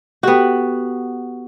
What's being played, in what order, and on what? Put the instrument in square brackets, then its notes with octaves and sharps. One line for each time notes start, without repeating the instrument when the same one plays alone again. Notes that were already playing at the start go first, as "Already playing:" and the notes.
[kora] B3 F#4 [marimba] G4 A4 G5